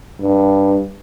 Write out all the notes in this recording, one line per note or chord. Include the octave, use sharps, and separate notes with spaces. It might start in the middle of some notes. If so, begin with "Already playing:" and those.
G2